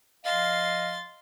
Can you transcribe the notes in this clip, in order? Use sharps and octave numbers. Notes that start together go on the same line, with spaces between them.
F3 D#5 F5 C6 A6